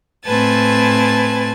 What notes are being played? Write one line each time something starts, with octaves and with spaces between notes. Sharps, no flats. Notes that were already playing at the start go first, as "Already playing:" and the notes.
A2 C4 B4 G#5 A5 A6